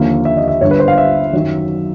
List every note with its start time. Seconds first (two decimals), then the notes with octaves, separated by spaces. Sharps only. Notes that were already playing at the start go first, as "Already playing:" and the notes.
Already playing: D#2 D3 F3 A#3 E5
0.25 E5
0.37 D#5
0.48 E5
0.61 G1 G2 D3 C#5
0.71 B4
0.80 C5
0.88 F5
0.98 E5
1.33 F#2 D#3 F#3